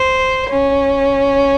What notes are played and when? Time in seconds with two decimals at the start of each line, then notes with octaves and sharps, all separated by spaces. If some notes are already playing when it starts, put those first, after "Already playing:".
Already playing: C5
0.50 C#4